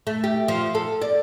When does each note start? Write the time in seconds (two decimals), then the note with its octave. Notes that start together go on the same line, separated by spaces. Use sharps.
0.07 A3
0.24 G4
0.48 F3
0.75 A4
1.02 D5